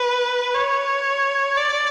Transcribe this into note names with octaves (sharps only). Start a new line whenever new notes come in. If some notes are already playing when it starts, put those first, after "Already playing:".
Already playing: B4
C#5
D5